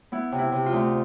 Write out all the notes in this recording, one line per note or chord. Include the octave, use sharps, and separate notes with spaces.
B3 E4
C3
E4
C3
F4
D2